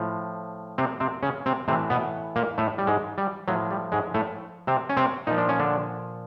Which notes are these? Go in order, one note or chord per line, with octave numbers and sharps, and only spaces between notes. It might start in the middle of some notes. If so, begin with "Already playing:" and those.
Already playing: A2 F3
C3 C4
C3 C4
C#3 C#4
C3 C4
A2 C3 E3 C4
B2 B3
A#2 A#3
A2 A3
G3
G#2 G#3
G3
A2 F3 F#3
G3
G#2 G#3
A2 A3
C3 C4
C#4
C3 C4
A#2 F3 D#4
D4
C#4
D3 D4